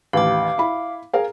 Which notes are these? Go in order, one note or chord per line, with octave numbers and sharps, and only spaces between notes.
A1 D#2 F5 D6
E4 B5
G#4 A#4 F5